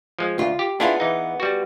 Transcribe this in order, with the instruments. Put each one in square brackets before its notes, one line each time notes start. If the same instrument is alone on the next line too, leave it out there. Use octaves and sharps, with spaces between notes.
[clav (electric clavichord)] F3 G#3
[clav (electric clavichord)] D2 [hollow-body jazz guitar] F4
[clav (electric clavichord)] G4
[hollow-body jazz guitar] B3 G#4 F5 [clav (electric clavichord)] D4 E4 F4
[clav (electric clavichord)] E3 D#4
G3 F#4